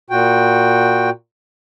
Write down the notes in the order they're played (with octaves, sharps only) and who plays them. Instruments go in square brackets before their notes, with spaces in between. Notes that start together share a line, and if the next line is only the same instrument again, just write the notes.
[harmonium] A#2 F#4 G5